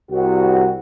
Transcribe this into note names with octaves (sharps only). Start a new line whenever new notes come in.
C2 F#4